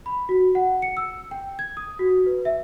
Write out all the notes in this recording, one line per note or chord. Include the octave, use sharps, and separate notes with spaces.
B5
F#4
F#5
C#7
E6
G5
G#6
D#6
F#4
B4
E5